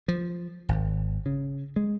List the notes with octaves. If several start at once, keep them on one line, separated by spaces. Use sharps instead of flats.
F3
G#1
C#3
G#3